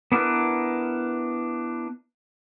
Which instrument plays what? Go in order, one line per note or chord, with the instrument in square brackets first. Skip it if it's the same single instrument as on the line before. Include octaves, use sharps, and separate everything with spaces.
[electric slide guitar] B3 D4 E4 F#4 A#4 B4